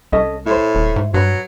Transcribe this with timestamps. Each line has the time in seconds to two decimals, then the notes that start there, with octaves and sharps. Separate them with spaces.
0.12 C2 C#4 A4 D#5
0.46 A2 E4 C5
0.75 D#1
0.96 G#2
1.14 G2 F#3 B4 B5